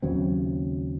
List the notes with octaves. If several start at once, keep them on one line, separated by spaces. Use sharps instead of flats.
D#2 C#3 F#3 C4